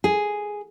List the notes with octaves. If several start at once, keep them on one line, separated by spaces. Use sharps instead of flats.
G#4